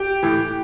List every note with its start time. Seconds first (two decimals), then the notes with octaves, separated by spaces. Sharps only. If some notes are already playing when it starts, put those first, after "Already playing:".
Already playing: G4 G5
0.23 A2 E3